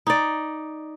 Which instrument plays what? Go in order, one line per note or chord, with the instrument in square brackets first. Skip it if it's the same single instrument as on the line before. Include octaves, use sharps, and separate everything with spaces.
[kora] D#4 D5